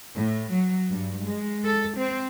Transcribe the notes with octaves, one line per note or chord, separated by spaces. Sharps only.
A2
F#3
G2
G#3
A4
C4